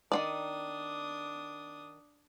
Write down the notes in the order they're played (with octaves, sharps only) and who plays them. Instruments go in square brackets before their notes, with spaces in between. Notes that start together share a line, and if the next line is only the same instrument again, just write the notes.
[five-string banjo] D#3 C4 D5 [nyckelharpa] D4 D#6